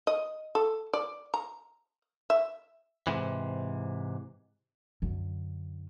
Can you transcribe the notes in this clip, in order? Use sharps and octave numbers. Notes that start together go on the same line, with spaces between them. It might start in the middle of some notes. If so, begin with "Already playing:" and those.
D#5
A4
D5
A#5
E5
G#2 C3 E3
F#2 D3